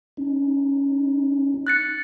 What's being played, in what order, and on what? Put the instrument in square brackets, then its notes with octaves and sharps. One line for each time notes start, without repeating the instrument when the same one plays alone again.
[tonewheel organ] C#4 D#4
[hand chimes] F#6 A6 C#7